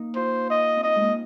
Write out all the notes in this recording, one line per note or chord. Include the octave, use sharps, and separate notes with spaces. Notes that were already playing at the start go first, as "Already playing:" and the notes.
Already playing: A#3 D#4
F4 C5
D#5
C4
D#4 D#5
G#3
A#3